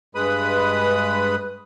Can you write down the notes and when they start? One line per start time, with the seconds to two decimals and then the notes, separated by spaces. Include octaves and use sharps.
0.15 G2 G#3 B4 B5 D#6